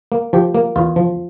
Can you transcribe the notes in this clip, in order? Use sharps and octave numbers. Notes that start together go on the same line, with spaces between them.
A#3
F3 G4
A#3
E2 F4
F3